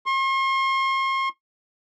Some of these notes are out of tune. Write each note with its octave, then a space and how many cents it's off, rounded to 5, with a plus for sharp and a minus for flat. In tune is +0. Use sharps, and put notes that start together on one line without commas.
C6 +45